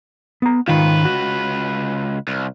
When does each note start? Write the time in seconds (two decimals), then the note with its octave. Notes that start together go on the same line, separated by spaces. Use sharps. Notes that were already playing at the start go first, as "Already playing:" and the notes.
0.42 B3 A#5
0.68 C#2 G#2 D#3 F4 B4
1.05 F#4
2.28 C2